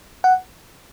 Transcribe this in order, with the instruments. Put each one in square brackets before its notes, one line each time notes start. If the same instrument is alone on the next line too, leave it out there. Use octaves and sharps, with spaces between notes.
[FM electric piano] F#5